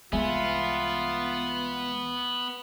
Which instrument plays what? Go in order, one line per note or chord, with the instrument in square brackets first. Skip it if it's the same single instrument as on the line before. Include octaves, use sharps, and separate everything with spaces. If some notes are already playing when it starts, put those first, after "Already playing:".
[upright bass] C2 E3 [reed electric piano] G#3 E5 G#5 [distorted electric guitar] B3 [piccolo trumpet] F4